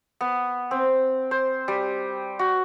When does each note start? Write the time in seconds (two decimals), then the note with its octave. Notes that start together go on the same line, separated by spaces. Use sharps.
0.21 B3
0.71 C4
1.31 C5
1.68 G3
2.39 F#4